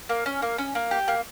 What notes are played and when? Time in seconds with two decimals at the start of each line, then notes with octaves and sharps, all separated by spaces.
0.09 A#3
0.26 C#4
0.42 A#3
0.58 C#4
0.75 A#3
0.91 G4
1.08 A#3